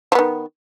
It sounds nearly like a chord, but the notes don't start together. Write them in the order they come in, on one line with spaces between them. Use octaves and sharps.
F3 B3 D#3